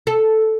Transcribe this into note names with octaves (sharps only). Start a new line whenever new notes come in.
A4